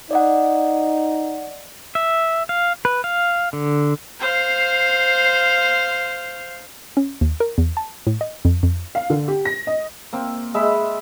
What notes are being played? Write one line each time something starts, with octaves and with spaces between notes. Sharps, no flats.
D#4 D5 D#5 F#5
E5
F5
B4
F5
D3
C5 F5
C#4
D#2
A#4
E2
A5
A2
D#5
F2
F2
F5
D3
G4
A#6
D#5
A#3 C4
G#3 E5 B5